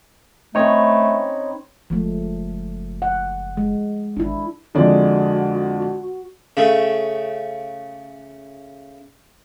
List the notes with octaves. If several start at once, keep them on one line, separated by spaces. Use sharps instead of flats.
A3 C4 C#4 D#4 B4 C#5 D#5
F#1 F3 G#3 A3
F#5
G#3
G#1 D4 E4
F2 D3 G#3 F#4 D5
C#3 A3